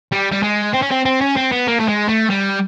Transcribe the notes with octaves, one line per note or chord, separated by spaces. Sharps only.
G3
G3
G#3
C4
C#4
C4
C4
C#4
C4
B3
A#3
A3
G#3
A3
G3